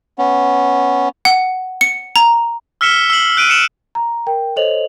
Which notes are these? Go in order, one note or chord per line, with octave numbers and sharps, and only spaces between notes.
B3 C#4
F#5
C#7
A#5
E6 F6 B6 C#7 E7 G7
E6 C7 F#7
F#6 D7 D#7
C#7 E7 F#7
A#5
A#4 G5
A4 C5 C#5 D#5 F7 F#7